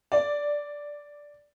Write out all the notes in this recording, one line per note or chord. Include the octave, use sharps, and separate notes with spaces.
D5